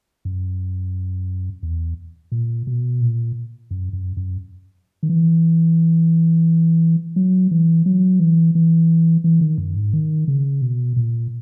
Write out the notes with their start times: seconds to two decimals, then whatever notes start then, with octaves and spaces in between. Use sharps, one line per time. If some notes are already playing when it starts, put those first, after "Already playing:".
0.25 F#2
1.63 E2
2.32 A#2
2.67 B2
3.01 A#2
3.71 F#2
3.93 F#2
4.17 F#2
5.03 D#3
5.09 E3
7.16 F#3
7.51 E3
7.86 F#3
8.20 E3
8.55 E3
9.24 E3
9.41 D#3
9.58 F#2
9.76 G#2
9.93 D#3
10.28 C#3
10.62 B2
10.96 A#2